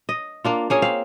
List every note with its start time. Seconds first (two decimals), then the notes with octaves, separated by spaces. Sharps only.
0.09 D#5
0.44 A#3 D4 F4
0.70 A#3 C#4 G#4
0.82 C4 F5